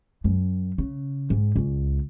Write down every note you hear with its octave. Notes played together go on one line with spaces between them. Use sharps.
F#2
C#3
G#2
C#2